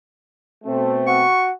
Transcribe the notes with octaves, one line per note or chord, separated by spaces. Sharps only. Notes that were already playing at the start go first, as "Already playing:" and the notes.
B2 A3 C4
F#4 C#6